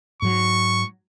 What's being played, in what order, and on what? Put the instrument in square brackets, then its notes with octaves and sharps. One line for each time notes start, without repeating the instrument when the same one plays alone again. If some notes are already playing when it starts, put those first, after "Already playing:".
[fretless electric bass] G#2 F#3 [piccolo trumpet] C#6